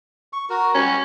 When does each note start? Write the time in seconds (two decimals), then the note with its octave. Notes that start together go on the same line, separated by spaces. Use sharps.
0.33 C#6
0.50 F#4 A#4
0.75 G3 C#4 F#4